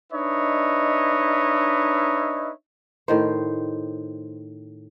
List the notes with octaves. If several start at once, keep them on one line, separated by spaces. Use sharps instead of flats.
D4 D#4 B4 C#5 D#5 E5
A2 D#3 C5